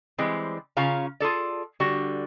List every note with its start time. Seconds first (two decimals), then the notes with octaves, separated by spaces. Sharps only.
0.18 E3 G3 G#3 C4
0.77 C#3 C#4 F4 F5 A#5
1.20 F4 G#4 A4 D5
1.80 D3 G3 F#4